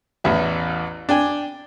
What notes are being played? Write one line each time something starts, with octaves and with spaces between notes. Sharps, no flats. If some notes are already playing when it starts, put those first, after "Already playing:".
A1 E2 E5
D4 G5 G#5